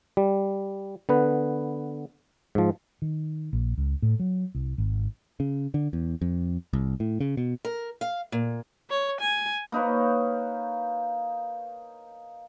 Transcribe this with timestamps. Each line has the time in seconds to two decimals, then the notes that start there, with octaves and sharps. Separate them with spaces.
0.17 G3
1.09 D3 B3 B4
2.55 G#2 F3
3.02 D#3
3.53 A#1
3.77 C#2
4.02 A2
4.20 F#3
4.55 C2
4.78 G#1
5.40 C#3
5.74 D3
5.93 E2
6.22 F2
6.73 C2
7.00 A2
7.20 C#3
7.37 B2
7.65 A#4
8.01 F5
8.32 A#2
8.90 C#5
9.20 G#5
9.72 A#3 D#4 B4 C#5